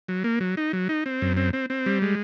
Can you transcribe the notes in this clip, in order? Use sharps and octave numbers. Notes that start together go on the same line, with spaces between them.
F#3
A#3
F#3
D#4
F#3
D#4
C4
F#2
C4
C4
C4
G3
G#3